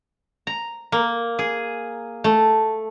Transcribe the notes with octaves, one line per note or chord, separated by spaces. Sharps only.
A#5
A#3
G#4
A3